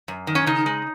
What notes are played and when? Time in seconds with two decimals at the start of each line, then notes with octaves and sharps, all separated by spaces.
0.08 F#2
0.27 D#3
0.35 C#4
0.46 C#3 D#4
0.66 G#3